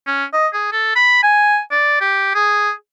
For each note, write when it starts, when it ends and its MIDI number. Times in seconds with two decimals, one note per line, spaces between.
0.07 0.25 61
0.33 0.48 75
0.53 0.70 68
0.72 0.93 69
0.96 1.23 83
1.23 1.60 80
1.71 2.00 74
2.01 2.34 67
2.35 2.72 68